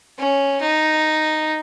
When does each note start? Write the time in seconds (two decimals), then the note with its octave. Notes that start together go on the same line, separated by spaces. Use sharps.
0.19 C#4
0.61 D#4